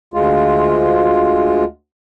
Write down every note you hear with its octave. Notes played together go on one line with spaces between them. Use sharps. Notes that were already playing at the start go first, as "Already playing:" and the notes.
D2 G#3 F4